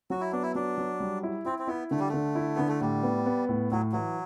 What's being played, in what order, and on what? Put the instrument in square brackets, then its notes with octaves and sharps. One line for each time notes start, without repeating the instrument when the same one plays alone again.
[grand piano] F#3 [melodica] F#4
[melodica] E4
[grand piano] B3 [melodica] D4
[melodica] E4
[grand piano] F#3 [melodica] D4
[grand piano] F#3
G3
E4
[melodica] C4 [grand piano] E4
[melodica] C4
[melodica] B3 [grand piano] E4
[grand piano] D3 [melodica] A3
[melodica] G3
[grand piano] D3 [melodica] A3
[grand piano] E4
[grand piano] D3 [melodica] B3
[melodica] A3
[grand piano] A2 [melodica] G3
[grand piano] B3
B3
A2
[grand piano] A2 [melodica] F#3
[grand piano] E3 [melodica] F#3